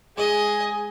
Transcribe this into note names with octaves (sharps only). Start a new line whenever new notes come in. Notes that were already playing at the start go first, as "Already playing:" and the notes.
G#3 G#4 D#5 G#5